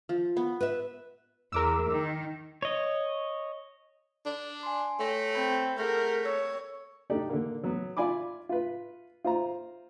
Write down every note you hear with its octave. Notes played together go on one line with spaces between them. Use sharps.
F3
B3
B4 E5
E2 A#4 D6 E6
D#3
C#5 D#5
D4
G#5 C6
A3 C#5 G5 A#6
C4 B5 G6
A3 G#4 A#4 F#5 G6
C#5 E6
D4 D#4 G4 A4 D5
D3 A#3
F#3 B3
F4 D5 G#5 B5 D6
F4 B4
F4 C5 A#5